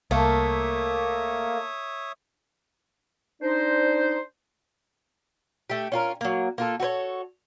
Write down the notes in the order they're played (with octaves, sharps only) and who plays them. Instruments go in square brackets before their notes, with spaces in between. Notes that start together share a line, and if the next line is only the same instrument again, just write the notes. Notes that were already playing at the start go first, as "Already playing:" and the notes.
[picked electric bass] C2 [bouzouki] A3 [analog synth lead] A#3 [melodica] C#5 E5 D#6
[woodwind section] D4 D#4 C5
[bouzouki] A3 G4
C#4 F4 A#4
F#3 A#3
A#3 F4 A4
F#4 A4 B4 C#5